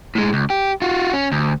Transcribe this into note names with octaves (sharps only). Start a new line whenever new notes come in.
A2 G#3
C#2
G4
F4 F#4
C#4
D2